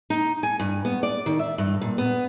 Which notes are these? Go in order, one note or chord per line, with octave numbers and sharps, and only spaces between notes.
D#4
G#5
G2
B3
D5
D#3
E5
G2
A#2
B3